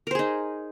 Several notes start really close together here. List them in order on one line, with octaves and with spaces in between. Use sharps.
A#4 C5 G#4 D#4